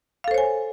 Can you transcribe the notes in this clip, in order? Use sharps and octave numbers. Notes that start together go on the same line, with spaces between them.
A4 C5 C#5 F5 G#5